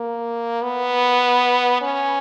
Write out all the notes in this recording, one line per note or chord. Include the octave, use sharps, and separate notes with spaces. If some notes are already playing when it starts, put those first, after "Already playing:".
Already playing: A#3
B3
C#4